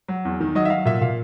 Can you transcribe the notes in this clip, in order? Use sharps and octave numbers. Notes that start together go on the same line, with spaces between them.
F#3
E2
D#3
F#3 D#5
E5
F#3 F5
A#2 E5
A#2 F5